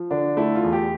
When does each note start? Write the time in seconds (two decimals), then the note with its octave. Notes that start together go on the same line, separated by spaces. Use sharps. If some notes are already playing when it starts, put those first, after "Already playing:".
Already playing: F3
0.11 D3 D4
0.37 A3 E4
0.55 F4
0.63 E2
0.72 G4